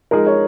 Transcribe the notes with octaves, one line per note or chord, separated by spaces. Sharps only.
F3 G#3 D#4 G#4 A#4
C#5